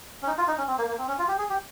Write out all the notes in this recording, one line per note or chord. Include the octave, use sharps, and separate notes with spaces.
C#4
D#4
F4
D#4
C#4
C4
A#3
A#3
C4
C#4
F4
G4
G#4
G4